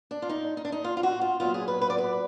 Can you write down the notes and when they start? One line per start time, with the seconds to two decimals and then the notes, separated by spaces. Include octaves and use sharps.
0.11 D4
0.22 F4
0.29 D#4
0.57 D#4
0.65 D4
0.72 D#4
0.84 F4
0.97 F4
1.03 F#4
1.21 F4
1.40 A#2 F#3 B3 F4
1.54 G#4
1.68 B4
1.81 B4
1.90 D5
1.98 B4